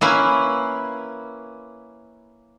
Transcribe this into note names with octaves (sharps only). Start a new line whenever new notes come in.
A#3 C#4 E4 B4 F5